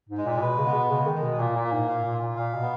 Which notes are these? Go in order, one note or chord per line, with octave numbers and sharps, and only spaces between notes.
G#2
G#3
A#2
A#2
B2 B4
C#3
B3
B2
C#3 G#3
D#3
G#3
B2
A#2 A#3
A#2
A#3
G#2
A#2 F5
A#2
F4
A#2
A#2 F5
B2
B3